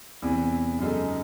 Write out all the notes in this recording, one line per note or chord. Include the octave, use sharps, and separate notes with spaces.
E2 C3 E3 C4
F#2 C#3 G#3 D#4 A4